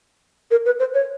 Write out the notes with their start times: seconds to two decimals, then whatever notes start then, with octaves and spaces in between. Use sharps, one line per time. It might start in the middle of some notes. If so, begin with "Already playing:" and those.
0.51 A#4
0.65 B4
0.79 C5
0.94 C#5